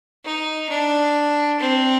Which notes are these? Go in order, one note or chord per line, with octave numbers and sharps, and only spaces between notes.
D#4
D4
C4